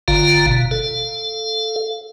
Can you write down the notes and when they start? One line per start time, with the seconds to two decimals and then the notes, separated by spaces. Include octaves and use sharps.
0.08 G1 D3 F4 F5 A#5
0.47 B2
0.71 A4 F5